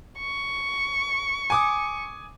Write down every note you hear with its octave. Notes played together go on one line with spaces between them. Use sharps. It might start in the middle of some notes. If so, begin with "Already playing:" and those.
C#6
G#5 D6 D#6